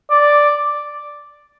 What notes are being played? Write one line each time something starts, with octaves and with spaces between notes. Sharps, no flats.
D5